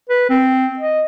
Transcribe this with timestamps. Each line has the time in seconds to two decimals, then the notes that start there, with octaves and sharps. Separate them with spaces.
0.10 B4
0.30 C4
0.79 D#5